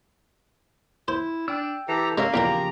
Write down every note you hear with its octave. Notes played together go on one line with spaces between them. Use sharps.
E4 C5
D4 G5 E6
E3 G4 A4 A#5
G#3 A#3 C#4 A#4 E5
E2 A#2 C#3 F3 G4 A#4 A#5